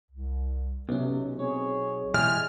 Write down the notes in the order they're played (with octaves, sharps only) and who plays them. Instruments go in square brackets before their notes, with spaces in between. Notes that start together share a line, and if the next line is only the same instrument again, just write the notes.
[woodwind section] C2
[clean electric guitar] B1 [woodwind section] C3 [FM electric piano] B3 C#4
[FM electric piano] C4 [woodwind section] G#4 C#5
[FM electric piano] B2 [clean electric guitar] E3 G3 G#3 [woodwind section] G#5 [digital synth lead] F6